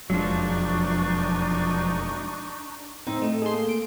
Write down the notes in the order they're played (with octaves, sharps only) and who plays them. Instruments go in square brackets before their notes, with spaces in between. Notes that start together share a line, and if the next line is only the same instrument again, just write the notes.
[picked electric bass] E1 F2 G#3 [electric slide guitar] F3 F#3 [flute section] D4 D#4 C#6
[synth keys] A2 C4 [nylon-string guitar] D#4 [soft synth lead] E6
[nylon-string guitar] A3 [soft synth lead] D#5
[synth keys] G#4 C6 [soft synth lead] A5
[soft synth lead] A#3
[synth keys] D7